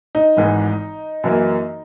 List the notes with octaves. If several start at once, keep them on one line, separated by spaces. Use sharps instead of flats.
D#4
G#1 G#2 E3 G#3
F#2 E3 A#3